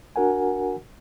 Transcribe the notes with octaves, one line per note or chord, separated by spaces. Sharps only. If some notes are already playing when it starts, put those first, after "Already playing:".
D4 F#4 A#4 F#5 G#5